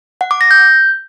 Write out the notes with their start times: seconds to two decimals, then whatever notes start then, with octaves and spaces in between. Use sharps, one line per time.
0.21 F#5
0.31 D6
0.41 A#6
0.51 G6